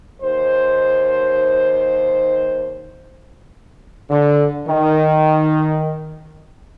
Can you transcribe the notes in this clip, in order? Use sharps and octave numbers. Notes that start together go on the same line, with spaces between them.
D#2 C5
D3
D#3